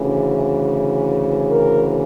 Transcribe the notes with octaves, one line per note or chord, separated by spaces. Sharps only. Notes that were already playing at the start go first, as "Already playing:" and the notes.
Already playing: D2 C#3 E3
A#4